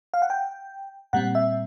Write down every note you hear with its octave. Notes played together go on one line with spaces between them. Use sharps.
F5
F#5
G5
A#2 G3 C4 F#5
E5